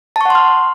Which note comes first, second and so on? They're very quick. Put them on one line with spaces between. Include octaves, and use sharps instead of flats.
A5 C#6 F#5 C6 F6